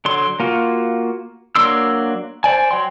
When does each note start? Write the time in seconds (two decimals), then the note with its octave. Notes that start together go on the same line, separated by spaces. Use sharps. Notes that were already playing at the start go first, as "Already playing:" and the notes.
0.05 D3 F#3 C6
0.40 A#3 F4 F#4
1.56 F#3 A#3 D4 C6 E6
2.44 C5 D5 G#5
2.71 F#3 G5 C6